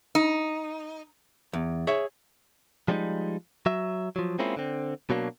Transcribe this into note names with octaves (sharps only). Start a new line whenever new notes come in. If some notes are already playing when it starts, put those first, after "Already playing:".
D#4
E2
G#4 C#5 E5
F3 G3 G#3 D4 D#4
F#3 E5
F3 F#3
G#3 A#3 C4 C#4 E4 F4
D3 C4
B2 F#3 A#3 C4 D4